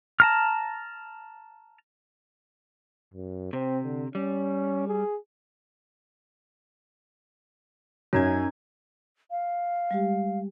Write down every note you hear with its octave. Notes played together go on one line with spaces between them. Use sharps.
A5 A#5 F6
F#2
C3 C4
D3
G3 C#4
G#4
F#2 C#4 D#4 G#6
F5
G3 G#3 G4